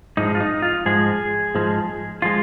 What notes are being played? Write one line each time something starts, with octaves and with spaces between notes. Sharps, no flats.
G#2 F3 G#3 D#4
F4
D#4
F4
G#2 F3 G#3 G#4
G#2 F3 G#3
F3 G#3 F4